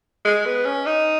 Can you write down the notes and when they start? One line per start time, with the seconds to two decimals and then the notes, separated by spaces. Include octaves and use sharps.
0.25 G#3
0.46 B3
0.65 C#4
0.86 D#4